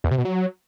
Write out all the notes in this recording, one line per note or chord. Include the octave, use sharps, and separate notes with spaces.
E2
C3
B2
F#3